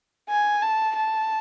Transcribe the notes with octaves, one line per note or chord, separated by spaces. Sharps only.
G#5
A5
A5